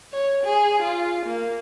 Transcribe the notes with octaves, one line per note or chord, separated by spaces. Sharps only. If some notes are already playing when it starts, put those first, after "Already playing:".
C#5
G#4
F4
A#3